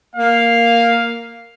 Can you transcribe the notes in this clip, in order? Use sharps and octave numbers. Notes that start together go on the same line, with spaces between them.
A#3 F5